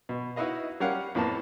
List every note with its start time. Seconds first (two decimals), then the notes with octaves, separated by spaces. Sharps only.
0.09 B2
0.36 D#4 E4 F#4 B4 D#5 F5
0.80 G3 C#4 A#4 F5 F#5
1.15 F2 A2 A#3 B3 A5